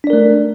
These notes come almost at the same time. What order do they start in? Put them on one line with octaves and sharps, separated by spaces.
D4 D5 A#4 A3